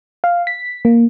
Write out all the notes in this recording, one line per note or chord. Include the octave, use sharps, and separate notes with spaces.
F5
B6
A#3